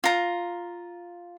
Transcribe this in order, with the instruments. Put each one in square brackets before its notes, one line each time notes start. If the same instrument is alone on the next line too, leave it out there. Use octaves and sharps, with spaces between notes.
[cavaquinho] F4 A#5